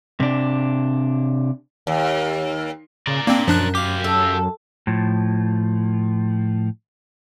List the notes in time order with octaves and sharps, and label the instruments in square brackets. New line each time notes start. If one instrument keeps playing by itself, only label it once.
[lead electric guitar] C3 D4
[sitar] D#2
[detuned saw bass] C#3 [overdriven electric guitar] A#4 D5
[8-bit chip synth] A#3 C4 [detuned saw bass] D4
[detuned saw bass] F#2 [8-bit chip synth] F3 D4 F#6
[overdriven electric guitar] G4 F5 [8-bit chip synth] D6
[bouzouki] A4
[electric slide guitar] A2 F3